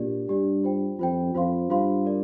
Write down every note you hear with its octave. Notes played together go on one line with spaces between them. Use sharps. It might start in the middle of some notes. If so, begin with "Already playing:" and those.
Already playing: A#2 D4 G4 D5
G2 D4 G4 D5
F4 C5 G5
F2 F4 C5 G5
F2 F4 C5 F5 C6
G2 F4 C5 F5 C6
F4 A#4 D5